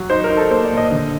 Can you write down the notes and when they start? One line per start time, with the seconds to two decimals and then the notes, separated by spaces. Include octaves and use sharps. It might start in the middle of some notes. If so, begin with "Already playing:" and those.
Already playing: F#3
0.10 D#4 C5
0.24 A#4
0.30 D#4
0.37 A4
0.50 A#3 C5
0.65 D5
0.71 A#2
0.77 D#5
0.91 D3